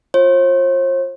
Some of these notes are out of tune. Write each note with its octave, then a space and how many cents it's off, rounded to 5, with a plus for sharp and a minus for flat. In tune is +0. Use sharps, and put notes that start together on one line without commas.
F4 +10 C5 +45